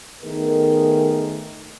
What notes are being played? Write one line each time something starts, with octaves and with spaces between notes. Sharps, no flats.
D#3 A3 B3 G#4 A#4